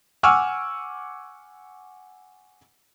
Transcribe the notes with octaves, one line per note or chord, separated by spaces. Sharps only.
F#5 G#5 C#6 D6 E6 F6